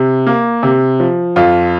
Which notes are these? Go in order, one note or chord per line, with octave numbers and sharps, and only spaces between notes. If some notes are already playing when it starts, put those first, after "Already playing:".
Already playing: C3
A#3
C3
F3
F2 F4